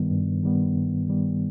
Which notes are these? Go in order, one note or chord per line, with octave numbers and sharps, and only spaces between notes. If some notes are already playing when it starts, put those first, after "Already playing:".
Already playing: G2 D#3 G3 B3
G2
D#3 G3 B3
G2
D#3 G3 B3